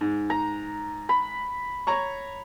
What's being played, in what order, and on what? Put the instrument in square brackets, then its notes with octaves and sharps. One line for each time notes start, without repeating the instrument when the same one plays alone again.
[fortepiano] G#2
[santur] A#5
B5
[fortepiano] C#5 A#5 C#6